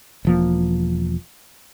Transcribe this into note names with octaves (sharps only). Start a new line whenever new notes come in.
E1 F3 A#3